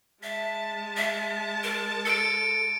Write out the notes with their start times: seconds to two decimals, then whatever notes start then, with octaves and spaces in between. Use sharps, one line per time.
0.23 G#3 E5 A5
0.97 E5
1.63 A#4
2.05 A4 C#7 D7